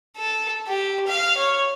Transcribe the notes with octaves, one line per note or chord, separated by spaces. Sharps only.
A4
G4
F5
C#5